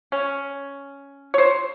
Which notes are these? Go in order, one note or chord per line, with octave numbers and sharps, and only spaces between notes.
C#4
C5 C#5